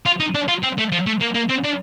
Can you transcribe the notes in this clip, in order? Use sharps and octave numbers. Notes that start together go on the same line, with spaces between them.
F4
D#4
D4
F4
C4
A3
F3
A3
A#3
A#3
C4
D4